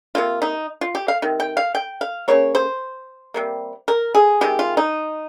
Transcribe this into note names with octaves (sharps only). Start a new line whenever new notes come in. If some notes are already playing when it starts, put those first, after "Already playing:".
C3 D#3 A#3 F4
D#4
F4
G4
F5
C3 D#3
G5
F5
G5
F5
C#3 G3 A#3 C#5
C5
C3 G3 A#3
A#4
G#4
C3 D#3 G#3 G4
F4
D#4